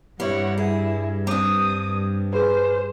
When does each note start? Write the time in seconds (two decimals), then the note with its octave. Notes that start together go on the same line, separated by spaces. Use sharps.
0.20 G2 G3 C4 E4 C#5 F#5
0.57 E4 G#4
1.27 C4 D4 D#6
2.33 G#4 B4 C5